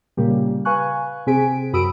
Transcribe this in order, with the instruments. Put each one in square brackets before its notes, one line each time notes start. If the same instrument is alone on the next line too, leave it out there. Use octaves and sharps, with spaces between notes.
[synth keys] A#2 C#3 G3 A#3 G4
B4 F5 G#5 C#6 F#6
C3 C4 G#4 G#5 B6 D7
F#2 F#4 B5 D#6 E6 D7